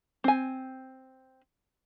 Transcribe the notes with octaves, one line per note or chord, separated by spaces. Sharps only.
C4 G#5